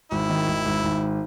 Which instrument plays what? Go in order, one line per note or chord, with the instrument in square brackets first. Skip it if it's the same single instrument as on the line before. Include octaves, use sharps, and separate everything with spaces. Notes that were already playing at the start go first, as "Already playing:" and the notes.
[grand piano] G#1 [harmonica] E4
[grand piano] D#3
G#1
G#1
G#1